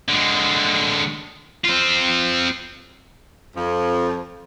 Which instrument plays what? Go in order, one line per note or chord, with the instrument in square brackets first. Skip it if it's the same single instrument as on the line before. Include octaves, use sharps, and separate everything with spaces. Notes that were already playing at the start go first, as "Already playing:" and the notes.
[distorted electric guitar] D3 G#3
C4 F4
[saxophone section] F2 F3